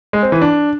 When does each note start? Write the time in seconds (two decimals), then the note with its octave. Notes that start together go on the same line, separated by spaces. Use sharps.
0.13 G#3
0.23 C4
0.32 E3
0.41 D4